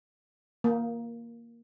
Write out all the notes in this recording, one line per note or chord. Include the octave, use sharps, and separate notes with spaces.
A#3